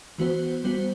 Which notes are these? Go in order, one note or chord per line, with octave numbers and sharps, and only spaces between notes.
E3 B3 F#4 C5
G3 B3 F#4 C5